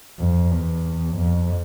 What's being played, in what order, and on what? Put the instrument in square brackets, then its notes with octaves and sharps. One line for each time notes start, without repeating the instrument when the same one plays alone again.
[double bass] F2
E2
F2